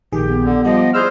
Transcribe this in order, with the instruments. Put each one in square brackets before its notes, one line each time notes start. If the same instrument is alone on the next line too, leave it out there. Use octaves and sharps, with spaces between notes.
[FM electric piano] A#1 D#3 G#4 [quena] G4
[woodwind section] B3
[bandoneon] D3
[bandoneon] F3 [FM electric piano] G3 [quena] D#5
[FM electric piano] D6
[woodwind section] E4 D5 F6 [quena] G#4 [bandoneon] C5 [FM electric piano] E6 G6